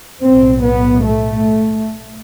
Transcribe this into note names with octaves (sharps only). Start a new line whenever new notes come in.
B1 A2 C4
B3
A3